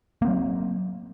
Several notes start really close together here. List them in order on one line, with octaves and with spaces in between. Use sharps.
A#3 C4 F#3